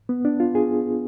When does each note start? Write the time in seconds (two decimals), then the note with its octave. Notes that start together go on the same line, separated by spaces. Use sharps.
0.09 B3
0.25 D4
0.40 F4
0.55 G#4